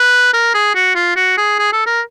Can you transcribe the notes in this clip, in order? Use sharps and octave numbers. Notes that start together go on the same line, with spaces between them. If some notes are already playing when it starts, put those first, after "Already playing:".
Already playing: B4
A#4
G#4
F#4
F4
F#4
G#4
G#4
A4
A#4